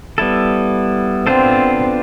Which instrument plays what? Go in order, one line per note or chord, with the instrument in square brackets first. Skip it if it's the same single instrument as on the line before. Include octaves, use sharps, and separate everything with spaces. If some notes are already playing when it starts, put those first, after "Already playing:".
[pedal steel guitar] G3 B3 E4 A4
[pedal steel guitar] B3 D4 F4 A4 C5 [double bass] C4